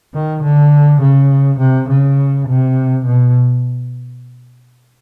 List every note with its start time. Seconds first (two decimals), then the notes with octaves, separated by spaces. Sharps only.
0.14 D#3
0.44 D3
1.01 C#3
1.60 C3
1.89 C#3
2.48 C3
3.06 B2